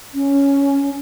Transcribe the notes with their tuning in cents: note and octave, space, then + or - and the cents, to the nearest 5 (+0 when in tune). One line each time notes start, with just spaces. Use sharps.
C#4 +5